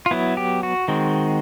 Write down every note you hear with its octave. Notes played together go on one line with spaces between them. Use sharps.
F4
F#3 B3 E4
G4
F#4
D#3 G#3 C4